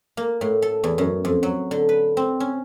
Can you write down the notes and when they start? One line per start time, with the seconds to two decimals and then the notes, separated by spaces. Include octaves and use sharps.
0.17 A#3
0.41 A2
0.62 A4
0.84 E2
0.98 F#2
1.25 F2
1.43 F#3
1.71 D3
1.89 B4
2.17 C4
2.40 C#4